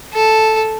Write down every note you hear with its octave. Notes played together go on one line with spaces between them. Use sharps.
A4